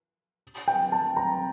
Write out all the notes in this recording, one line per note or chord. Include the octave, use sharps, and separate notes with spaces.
G5
A5
A#5